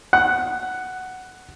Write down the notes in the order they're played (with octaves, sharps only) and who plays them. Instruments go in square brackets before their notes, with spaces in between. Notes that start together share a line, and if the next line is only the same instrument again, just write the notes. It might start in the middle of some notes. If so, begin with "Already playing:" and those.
[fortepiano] F#5